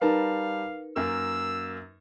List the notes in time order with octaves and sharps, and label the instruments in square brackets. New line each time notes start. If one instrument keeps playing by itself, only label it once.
[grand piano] G3 A5 A#5 [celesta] D#4 A#4 B4 [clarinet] F5
[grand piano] F#2 A#3 [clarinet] E6